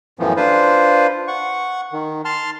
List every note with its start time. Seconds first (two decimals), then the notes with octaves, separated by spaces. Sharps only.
0.19 F#2 A2 E3 F3 B3
0.37 D4 F4 B4 C5
1.28 F#5 C#6
1.92 D#3
2.25 A5 C6 F6